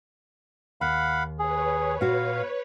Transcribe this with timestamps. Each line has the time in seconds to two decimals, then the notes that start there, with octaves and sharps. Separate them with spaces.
0.81 D#2 F5 F#5 B5
1.39 G#4 B4 C#5
2.01 A#2 F#4 F5